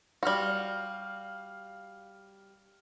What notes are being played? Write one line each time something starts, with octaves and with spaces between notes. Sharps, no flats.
G3 F#4 F5 F6